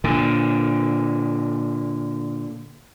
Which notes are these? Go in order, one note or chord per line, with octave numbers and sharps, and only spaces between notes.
A#2 D3